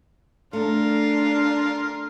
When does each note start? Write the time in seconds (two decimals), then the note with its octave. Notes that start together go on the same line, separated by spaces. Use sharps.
0.53 A3 D4 F4 A#4